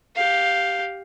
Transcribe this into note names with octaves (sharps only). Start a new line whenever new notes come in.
G4 F5